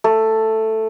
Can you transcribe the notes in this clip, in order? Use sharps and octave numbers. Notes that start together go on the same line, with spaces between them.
A3